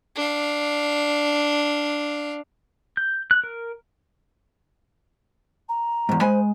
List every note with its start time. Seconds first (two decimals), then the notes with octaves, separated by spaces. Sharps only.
0.16 D4 F5
2.97 G6
3.31 F#6
3.44 A#4
5.69 A#5
6.09 E2 G#2
6.21 G#3 C5 G#5 B5